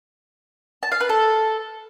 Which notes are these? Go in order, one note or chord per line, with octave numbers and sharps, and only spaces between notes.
A5
F5
B4
A4